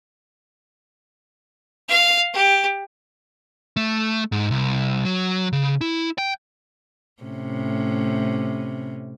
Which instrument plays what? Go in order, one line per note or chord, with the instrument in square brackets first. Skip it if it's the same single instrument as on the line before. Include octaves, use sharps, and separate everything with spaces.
[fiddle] F5
G4
[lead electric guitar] A3
G#2
C2
F#3
C#3
E4
G5
[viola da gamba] A2 C3 C#4